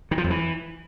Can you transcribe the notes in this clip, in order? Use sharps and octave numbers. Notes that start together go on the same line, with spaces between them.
D#3
F3
F2
E3